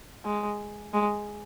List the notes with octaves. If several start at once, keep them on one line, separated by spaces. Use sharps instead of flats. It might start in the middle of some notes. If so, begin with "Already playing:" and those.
G#3
G#3